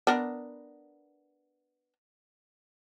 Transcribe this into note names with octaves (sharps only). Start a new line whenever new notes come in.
B3 D4 A#4